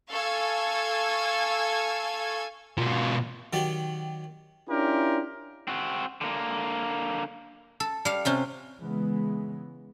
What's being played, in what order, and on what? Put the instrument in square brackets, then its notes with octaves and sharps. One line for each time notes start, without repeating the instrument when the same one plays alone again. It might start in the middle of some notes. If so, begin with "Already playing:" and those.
[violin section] A4 F5 G#5 C#6 E6 G#6
[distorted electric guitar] B2 F4
[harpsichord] D#3 F#3 G4 D5
[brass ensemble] C#4 D4 E4 F4 G4 A#4
[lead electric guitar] C4 F#4
D3 A#3
[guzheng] A4
G3 F5
C3 C#4 F4
[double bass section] C#3 E3 G#3 B3